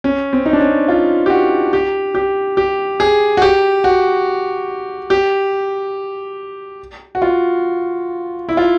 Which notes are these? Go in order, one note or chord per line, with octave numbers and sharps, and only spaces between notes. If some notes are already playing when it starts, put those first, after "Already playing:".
C#4
C4
D#4
D4
C#4
F4
G4
F#4
G4
G4
G4
G#4
F#4
G4
F#4
G4
F#4
F4
E4
F4